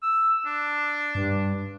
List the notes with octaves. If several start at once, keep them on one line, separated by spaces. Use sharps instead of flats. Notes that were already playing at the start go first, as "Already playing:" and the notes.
E6
D4
G2